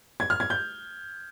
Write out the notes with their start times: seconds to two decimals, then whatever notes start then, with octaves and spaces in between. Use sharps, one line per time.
0.20 G#6
0.30 F6
0.40 G#6
0.50 G6